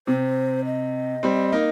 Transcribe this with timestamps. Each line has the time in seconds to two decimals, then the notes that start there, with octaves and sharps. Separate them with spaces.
0.07 C3 C5
0.65 D#5
1.23 G3 C4
1.52 A#3 D#4